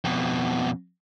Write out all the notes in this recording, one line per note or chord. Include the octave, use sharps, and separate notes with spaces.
F2 B2